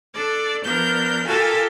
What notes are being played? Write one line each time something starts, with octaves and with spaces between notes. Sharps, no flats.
D4 A4 D5
F3 B3 D4 A#4 G6
F4 G4 A4 A#4 G#5 A5